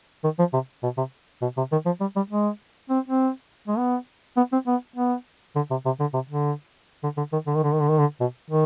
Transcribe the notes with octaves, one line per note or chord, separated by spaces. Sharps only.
D#3
F3
C3
B2
C3
B2
C3
D#3
F3
G3
G3
G#3
C4
C4
G#3
B3
B3
C4
B3
B3
D3
C3
C3
D3
C3
D3
D3
D3
D#3
D3
D#3
D3
D#3
D3
D#3
D3
B2
D#3